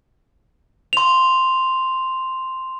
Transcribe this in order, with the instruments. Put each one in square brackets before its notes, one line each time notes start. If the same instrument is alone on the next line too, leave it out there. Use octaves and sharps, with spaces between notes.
[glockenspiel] C6 F7